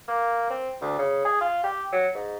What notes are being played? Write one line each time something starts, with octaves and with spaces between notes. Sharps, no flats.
A#3
C4
D2
C#3
G#4
F4
G4
F#3
G#2